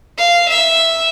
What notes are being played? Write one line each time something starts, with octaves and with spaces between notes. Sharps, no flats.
F5
E5